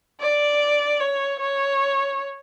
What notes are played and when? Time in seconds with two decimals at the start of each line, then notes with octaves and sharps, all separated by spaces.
0.21 D5
1.00 C#5
1.40 C#5